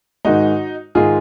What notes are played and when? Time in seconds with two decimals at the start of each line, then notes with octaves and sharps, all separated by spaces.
0.25 G#2 D#3 G#3 D#4 F#4
0.95 G#2 D#3 G#3 F4 G#4